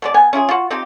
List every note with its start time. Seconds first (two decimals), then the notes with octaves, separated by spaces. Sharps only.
0.02 B2 G#3 D5
0.14 B3 G#5
0.33 C#4 E4 F4 G#4
0.49 F4 F#4
0.70 C4 D#4 F4 G4